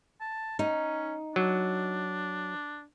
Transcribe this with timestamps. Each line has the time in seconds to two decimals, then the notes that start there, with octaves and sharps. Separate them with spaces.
0.21 A5
0.59 C#4 D#4
1.36 F#3 D4